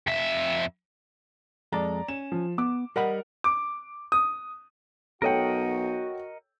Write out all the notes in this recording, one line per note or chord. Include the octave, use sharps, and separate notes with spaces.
F2 E5
F2 G#3 A4 D5 A#5
C#4 E7
F3
B3 D6
G3 A#4 D#5 F#5 B5
D6
D#6
B1 F#4 A4 A#4 C#5 D#5 F#5 G5